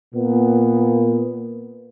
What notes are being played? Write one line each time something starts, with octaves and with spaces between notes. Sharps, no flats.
A#2 B3